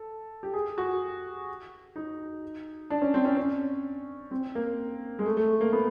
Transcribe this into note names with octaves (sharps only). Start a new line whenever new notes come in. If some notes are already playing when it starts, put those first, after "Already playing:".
Already playing: A4
G4
G#4
F#4
D#4
D4
C#4
C4
C#4
C#4
C4
A#3
G#3
A3
A3
A#3
B3